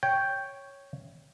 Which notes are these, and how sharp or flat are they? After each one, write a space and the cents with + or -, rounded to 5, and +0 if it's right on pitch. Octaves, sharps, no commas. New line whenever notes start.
C#5 +0 G5 +0